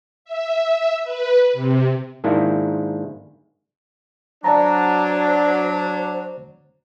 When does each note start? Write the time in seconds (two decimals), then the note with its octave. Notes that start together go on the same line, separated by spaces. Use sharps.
0.25 E5
1.04 B4
1.53 C3
2.24 G#2 D#3 A#3 D4 E4
4.44 F#3 D4 C5 D5 A5 A#5